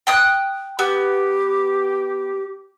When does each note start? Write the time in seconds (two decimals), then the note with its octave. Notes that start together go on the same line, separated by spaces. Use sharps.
0.07 G5 D#6 F#6
0.79 B3 G4